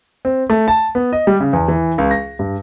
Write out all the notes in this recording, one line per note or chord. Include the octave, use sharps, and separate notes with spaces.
C4
A3
A5
B3
D#5
G3
C#3
E2
E3
C#2
A#6
G2